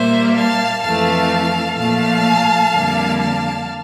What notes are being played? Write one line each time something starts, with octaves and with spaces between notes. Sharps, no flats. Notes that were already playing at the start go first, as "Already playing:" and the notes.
Already playing: A#2 G3 A#3 C5 E5
F5 A5
F2 E3 A3 F5 A5
A#2 F3 A3 F5 A5
F2 D3 G3 A#3
F5 A5